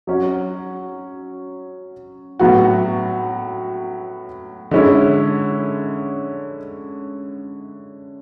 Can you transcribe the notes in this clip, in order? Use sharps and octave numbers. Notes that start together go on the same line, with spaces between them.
F#3 C#4 F#4
A2 F#3 B3 F#4
D3 G#3 C#4 E4